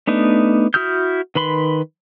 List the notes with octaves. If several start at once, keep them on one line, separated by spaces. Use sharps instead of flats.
A3 B3 D4 D#4
E4 F#4 D#6 F6 G6
D#3 B4 B5 C6